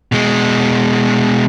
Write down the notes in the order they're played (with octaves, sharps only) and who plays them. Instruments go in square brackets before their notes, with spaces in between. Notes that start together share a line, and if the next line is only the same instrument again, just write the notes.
[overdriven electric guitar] B2 G#3